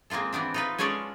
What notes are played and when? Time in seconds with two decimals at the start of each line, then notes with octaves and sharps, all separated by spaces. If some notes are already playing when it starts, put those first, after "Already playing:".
0.10 G#3 A#3 C4 F4 A4
0.33 E3 B3 C4 D4
0.54 D#4 F4 B4
0.78 G#3 C#4 F4 A4 C#5 D5